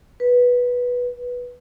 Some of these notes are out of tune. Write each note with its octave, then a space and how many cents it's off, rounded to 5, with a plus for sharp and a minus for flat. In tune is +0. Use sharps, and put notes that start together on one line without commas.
B4 -10